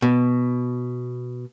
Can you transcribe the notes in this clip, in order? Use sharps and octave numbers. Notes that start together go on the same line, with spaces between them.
B2